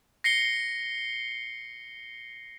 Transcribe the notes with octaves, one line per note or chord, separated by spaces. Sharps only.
A#6 C7 C#7 G7